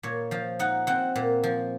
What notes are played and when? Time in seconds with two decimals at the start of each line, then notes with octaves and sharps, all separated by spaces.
0.03 A#2 C#5
0.31 F3 F5
0.59 D#4 F#5
0.87 C4 F#5
1.16 A#2
1.43 F3